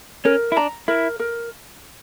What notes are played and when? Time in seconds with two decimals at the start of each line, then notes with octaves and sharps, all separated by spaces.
0.25 C#4 A#4
0.52 E4
0.57 D4 A#5
0.88 E4 A#4
1.20 A#4